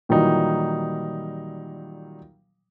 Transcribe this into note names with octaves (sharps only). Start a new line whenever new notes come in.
A#2 D#3 E3 F#3 G3 D#4